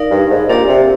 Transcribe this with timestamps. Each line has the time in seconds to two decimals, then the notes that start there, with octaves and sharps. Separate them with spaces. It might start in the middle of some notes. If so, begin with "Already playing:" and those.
Already playing: D#4 A#4 D5 F5
0.11 G2
0.30 G#2
0.49 A#2 D4 G4 D5
0.68 C3